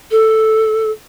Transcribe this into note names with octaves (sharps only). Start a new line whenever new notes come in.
A4